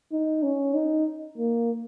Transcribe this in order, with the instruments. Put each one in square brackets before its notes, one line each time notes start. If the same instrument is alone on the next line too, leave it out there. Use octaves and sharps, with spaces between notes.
[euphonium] D#4
C#4
D#4
A#3